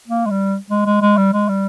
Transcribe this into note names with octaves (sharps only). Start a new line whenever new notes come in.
A#3
G#3
G3
G#3
G#3
G#3
G3
G#3
G3